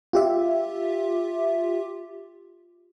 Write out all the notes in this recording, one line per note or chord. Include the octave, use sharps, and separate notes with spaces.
F4 G4 E5